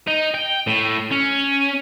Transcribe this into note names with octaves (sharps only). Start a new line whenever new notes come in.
D#4
G5
A2
C#4